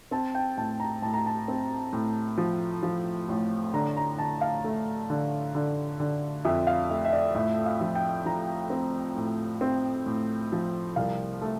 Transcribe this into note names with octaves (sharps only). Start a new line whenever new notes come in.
C4 A5
G5
A2 A5
A#5
A2 A5
A#5
A5
C4
A2
F3
F3
A1
D3 A#5
A#5
D3 A5
F5
A3
D3
D3
D3
F2 E5
F5
A3 E5
E5
D5
A2 E5
F5
F3
G5
F3 A#5
C4
A2
C4
A2
F3
C2 F5
A3